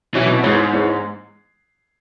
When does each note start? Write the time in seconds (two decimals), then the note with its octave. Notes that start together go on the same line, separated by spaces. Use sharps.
0.14 B2 E3 F#3 C#4 F#4
0.29 B2
0.43 G#2 E3 B3 G#4 C#5
0.73 E3 B3 G#4 C#5